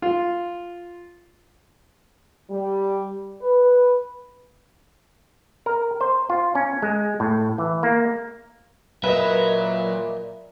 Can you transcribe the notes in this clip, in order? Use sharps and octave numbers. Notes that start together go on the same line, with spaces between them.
F4
G3
B4
A#4
C5
F4
C#4
G#3
A2
E3
A#3
A#2 F#3 B4 D#5 E5